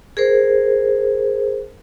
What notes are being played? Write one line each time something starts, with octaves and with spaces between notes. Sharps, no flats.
G#4 A#4 C5